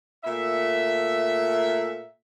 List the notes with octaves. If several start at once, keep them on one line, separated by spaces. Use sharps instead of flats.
A#2 A3 E5